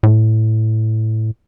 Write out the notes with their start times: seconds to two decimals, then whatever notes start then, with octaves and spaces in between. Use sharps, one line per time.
0.03 A2